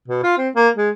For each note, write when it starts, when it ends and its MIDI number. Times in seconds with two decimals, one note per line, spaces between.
0.08 0.23 47
0.23 0.37 65
0.38 0.49 60
0.55 0.69 58
0.77 0.90 56